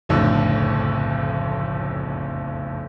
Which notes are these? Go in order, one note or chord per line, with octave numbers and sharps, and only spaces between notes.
F#1 B1 F2 A2 D3